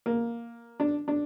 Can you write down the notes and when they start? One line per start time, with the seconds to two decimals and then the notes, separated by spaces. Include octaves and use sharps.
0.06 A#3
0.80 D4
1.08 D4